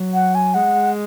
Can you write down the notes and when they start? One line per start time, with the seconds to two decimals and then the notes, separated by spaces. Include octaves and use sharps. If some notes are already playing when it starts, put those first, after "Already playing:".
Already playing: F#3
0.14 F#5
0.35 G#5
0.54 G#3 F#5